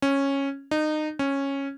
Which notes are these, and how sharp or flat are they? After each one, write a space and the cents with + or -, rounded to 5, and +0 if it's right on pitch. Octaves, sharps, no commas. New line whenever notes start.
C#4 -10
D#4 -25
C#4 -10